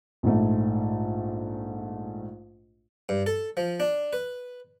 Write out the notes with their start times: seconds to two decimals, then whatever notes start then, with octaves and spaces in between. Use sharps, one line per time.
0.23 A#1 G#2 A3
3.09 G2
3.26 A4
3.57 F3
3.80 D4
4.13 B4